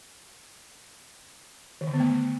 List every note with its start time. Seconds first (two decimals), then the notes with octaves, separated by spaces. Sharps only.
1.81 D#3
1.87 D3
1.94 B3
2.00 A3